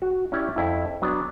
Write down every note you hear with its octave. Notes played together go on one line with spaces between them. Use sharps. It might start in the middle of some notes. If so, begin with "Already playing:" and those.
F#4
C#4 E4 G4 C#5 D5
F2 E4
F#3 B3 D4